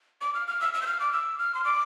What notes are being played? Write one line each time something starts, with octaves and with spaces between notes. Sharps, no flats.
D6
F6
F6
E6
E6
G6
F6
D6
E6
F6
C6
D6